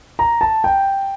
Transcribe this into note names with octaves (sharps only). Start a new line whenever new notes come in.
A#5
A5
G5